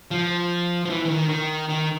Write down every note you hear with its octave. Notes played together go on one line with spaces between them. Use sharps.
F3
F3
E3
E3
D#3
D#3
D#3